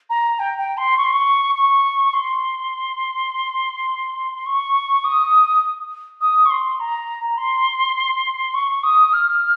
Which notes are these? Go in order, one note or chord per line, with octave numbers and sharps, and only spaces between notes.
A#5
G5
G5
C6
C#6
C6
C#6
C#6
C6
C#6
D#6
D#6
C#6
C6
A#5
C6
C#6
D#6
F6